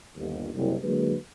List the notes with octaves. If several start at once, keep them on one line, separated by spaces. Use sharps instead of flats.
G1 D#2
F#1 C2
D3 F#3 G#3 A#3 B4